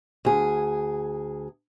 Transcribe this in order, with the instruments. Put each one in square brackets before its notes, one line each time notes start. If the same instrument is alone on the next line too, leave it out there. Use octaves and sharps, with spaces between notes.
[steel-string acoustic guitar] D2 G#4